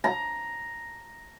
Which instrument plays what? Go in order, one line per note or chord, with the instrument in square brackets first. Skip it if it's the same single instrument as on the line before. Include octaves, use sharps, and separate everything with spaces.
[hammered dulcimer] A#5